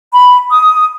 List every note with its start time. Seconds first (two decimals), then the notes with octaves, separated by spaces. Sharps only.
0.13 B5
0.51 D#6